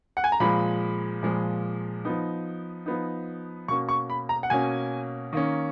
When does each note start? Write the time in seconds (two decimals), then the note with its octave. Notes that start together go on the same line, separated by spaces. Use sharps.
0.17 F#5
0.24 G#5
0.32 A#5
0.40 A#2 F3 G#3 B5
1.23 A#2 F3 G#3
2.05 F3 B3 D#4
2.86 F3 B3 D#4
3.68 B2 A#3 C#4 C#6
3.89 C#6
4.10 B5
4.29 A#5
4.43 F#5
4.50 B2 A#3 C#4 G#5
5.33 D#3 A#3 C#4